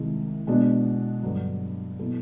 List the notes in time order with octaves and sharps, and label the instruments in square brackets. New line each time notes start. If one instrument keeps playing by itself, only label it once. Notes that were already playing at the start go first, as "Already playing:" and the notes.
Already playing: [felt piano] C2 C3 D#3 G#3
B2 G#3 B3 D4 F#4
G2 D3 F#3
B2 F#3 B3 E4 A4